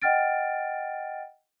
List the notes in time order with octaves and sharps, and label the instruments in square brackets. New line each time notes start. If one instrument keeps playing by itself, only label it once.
[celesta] D#5 F#5 G5 F6 A6 D7